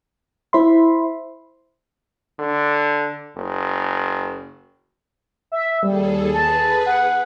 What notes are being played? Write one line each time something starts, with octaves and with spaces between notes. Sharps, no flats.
E4 C5 E5 B5 C6
D3
F#1
E5
D#2 G3 G#4 A4
G#4 B4 A5
F#5